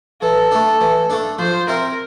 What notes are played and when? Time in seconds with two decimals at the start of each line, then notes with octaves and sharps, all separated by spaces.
0.21 E3 A4
0.51 A3 D4
0.81 E3
1.10 A3 D4
1.38 F3 C5
1.68 C4 E4 A#4